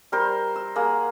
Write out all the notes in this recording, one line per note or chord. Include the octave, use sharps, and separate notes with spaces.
G3 A#4 C5
E6
A#3 G#4 F#5